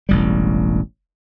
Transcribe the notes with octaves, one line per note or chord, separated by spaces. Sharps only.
E1 A1 G3